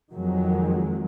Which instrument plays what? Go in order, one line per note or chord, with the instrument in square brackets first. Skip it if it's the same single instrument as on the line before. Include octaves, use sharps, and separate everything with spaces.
[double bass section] F2 D#3 F#3 G#3